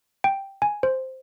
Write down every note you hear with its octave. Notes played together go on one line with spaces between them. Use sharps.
G5
G#5
C5